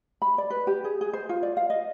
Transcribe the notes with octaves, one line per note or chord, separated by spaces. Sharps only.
B5
D5
B4
G4
G#4
G#4
C5
F4
D5
F5
D#5